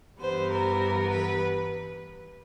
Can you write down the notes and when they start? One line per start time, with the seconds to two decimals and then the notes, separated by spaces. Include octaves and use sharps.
0.20 G2 E3 G3 B3 C5
0.50 A#4
1.10 B4